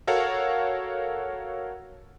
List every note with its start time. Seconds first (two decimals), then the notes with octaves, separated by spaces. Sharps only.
0.07 F#4 A4 A#4 C#5 F5 F#5